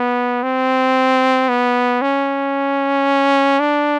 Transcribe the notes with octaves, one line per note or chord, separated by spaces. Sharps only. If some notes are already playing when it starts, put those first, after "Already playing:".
Already playing: B3
C4
B3
C#4
D4